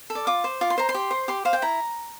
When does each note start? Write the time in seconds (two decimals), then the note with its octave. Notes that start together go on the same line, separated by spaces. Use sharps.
0.10 A4
0.15 D5
0.27 F4 D6
0.44 C5
0.61 F4 D6
0.70 C6
0.78 C5 A#5
0.89 C6
0.94 G4
1.11 C5
1.28 G4 C6
1.45 C5 F5
1.53 G5
1.62 E4 A#5